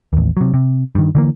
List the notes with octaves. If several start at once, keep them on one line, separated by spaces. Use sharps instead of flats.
A1 D#2
C3 F#3
C3
G2 D#3
D3 E3 A#3